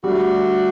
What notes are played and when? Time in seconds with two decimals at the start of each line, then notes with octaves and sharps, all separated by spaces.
0.03 D3 G3 A3 D4 F#4